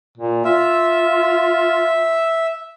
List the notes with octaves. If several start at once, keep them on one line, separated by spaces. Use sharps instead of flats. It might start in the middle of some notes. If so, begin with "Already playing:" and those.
A#2
F4 E5